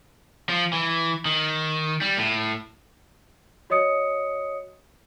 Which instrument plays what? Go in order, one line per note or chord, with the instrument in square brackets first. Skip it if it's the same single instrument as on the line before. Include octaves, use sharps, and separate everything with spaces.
[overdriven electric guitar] F3
E3
D#3
G3
A2
[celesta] F#4 C#5 D#5 D#6 C#7